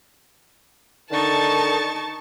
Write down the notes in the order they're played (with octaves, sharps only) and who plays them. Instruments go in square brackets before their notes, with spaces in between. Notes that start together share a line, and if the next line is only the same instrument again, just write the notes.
[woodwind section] D3 D#3 [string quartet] D#4 C#6 A6 [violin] A5